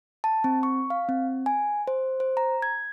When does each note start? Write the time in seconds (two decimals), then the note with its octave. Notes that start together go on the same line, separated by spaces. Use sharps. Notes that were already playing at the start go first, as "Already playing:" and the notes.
0.24 A5
0.44 C4
0.63 C#6
0.90 F5
1.09 C4
1.46 G#5
1.87 C5
2.20 C5
2.37 A#5
2.62 G#6